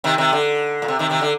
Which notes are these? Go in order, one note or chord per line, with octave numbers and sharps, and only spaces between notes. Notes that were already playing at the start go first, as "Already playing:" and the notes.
C3 D#3
C3 D#3
D3
A#2
C3
C3 D#3
C3 D#3
D3